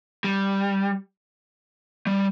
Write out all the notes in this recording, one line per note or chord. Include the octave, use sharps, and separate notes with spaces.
G3
G3